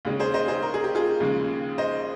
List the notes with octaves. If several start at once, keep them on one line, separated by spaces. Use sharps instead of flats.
D#2 C#3 G#3 C#4
G#4 C5
C5 D#5
G#4 C5
A#4
G#4
G4
F4 G#4
D#2 C#3 F3 G#3
C5 D#5